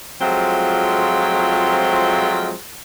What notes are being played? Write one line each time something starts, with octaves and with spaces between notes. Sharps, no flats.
F3 F#3 G#3 A3 C4 F4